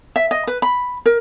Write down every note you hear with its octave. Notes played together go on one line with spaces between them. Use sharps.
E5
D#5
B4
B5
A#4